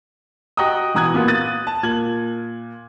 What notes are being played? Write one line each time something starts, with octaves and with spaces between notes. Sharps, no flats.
F#4 D#5 F#5 G5 A#5 D#6
B2 E3 A#5 D#6 F#6 G#6
A#2 B3 F4
D#6 F#6 A6 D#7
A5
A#2 G#6 F#7